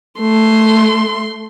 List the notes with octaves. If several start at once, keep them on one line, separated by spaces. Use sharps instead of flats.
A3 C6